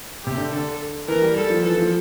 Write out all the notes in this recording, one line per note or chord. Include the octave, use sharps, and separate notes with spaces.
C3 G4
D3
D3 A4
E3 A#4
G3
G3 A4
F3
E3 A4
F3